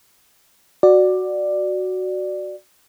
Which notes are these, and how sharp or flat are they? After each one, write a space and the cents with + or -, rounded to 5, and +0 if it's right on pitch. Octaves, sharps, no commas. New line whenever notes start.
F#4 +0 D5 +10